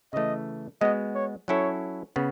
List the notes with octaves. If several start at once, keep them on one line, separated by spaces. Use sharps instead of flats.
C#3 E3 A3 D#5
G#3 B3 F#4 D#5
C#5
F#3 C#4 E4 A4 C#5
C#3 B3